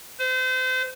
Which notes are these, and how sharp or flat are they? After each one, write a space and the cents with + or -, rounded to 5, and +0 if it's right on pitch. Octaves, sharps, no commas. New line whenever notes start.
C5 -35